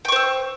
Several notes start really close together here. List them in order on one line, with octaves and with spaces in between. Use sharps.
G5 C#6 C5 E6